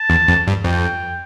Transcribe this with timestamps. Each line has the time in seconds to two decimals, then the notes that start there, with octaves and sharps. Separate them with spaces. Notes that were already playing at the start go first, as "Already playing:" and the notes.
Already playing: A5
0.10 E2
0.28 F2
0.47 G2
0.64 F2 G5